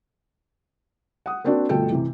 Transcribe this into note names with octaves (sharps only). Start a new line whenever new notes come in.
F#5 D#6
A#3 C4 D4 F#4 D5
G1 B2 F3 A3 A4 G5
C3 E3